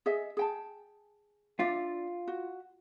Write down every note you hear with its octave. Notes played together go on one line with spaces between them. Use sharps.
G#4 D#5 E5
G#4 G5 A5
D4 F4 D5 E5
F#4